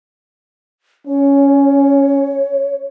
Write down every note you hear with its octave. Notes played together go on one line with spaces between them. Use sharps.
C#4 C#5